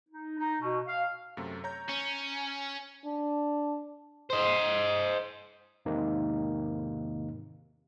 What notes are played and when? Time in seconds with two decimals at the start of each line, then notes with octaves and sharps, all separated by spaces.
0.09 D#4
0.39 D#4
0.61 B2
0.87 F5
1.37 F#2 C3 A3
1.64 C#5 A#5 G6
1.89 C#4
3.05 D4
4.30 C5 D#5
5.85 E2 G#2 C3 D#3 A#3 D#4